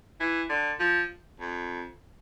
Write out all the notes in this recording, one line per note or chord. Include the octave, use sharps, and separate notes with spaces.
E3
D3
F3
F2